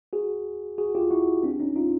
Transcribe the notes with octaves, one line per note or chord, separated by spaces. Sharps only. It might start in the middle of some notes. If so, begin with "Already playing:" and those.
F#4 G#4
F#4 G#4
F4 G4
E4 F#4
C4 D4
C#4 D#4
D#4 F4